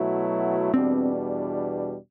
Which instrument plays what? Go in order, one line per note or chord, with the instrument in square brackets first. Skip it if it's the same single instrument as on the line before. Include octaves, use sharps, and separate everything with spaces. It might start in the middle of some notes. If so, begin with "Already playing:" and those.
Already playing: [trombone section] B2 F#3 A3 E4
[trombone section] E2 B2 G3 D4 [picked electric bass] C4